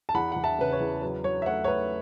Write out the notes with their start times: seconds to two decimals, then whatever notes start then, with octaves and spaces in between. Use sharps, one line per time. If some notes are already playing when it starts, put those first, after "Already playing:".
0.09 A5
0.14 E2 F#5 B5
0.32 E2 F#5
0.44 E5 A5
0.58 C#3 B4
0.72 C#5
0.80 E2
1.02 F#3 B4
1.24 F#3 C#5
1.42 E5
1.46 A3 C#5 F#5
1.64 C#5
1.68 A3 B4